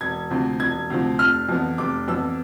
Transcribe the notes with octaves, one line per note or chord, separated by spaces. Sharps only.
E1 G#6
D2 C3 F3
E1 G#6
D2 C3 F3
F1 F6
F2 E3 B3
F1 D6
F2 E3 B3 E6